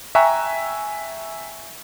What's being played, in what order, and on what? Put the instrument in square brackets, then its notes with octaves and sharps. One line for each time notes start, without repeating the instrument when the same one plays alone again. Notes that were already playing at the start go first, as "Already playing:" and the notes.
[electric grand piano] E5 G5 G#5 A#5 C#6 F#6